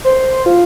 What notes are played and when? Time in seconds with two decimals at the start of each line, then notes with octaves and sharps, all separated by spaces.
0.04 C5
0.46 F4